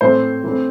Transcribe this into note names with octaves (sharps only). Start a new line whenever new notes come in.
A2 E3 A3 C4 C5
E3 A3 C4